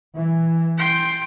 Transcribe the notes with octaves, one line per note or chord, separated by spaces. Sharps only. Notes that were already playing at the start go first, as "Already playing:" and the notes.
E3
G5 C6